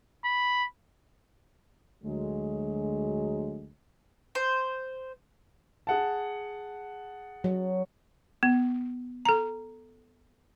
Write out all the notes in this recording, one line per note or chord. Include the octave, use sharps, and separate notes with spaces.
B5
D2 F#3 G#3
C5
G#4 F#5 A5
F#3
B3
A4 A#5